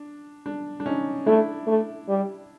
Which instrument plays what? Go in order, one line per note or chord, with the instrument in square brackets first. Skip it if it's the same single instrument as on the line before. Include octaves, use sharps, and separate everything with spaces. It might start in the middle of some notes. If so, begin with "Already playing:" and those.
Already playing: [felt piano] D4
D4
D4
C#4 D#4
[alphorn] A3 [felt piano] D4 E4
[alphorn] A3
G3